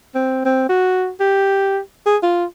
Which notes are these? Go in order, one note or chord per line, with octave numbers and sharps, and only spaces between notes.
C4
C4
F#4
G4
G#4
F4